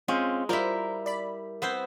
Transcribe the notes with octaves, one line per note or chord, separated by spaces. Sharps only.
G#3 C4 C#4 F4
G3 E4 F4 A#4 C5
D5 B5
B3 C4 C5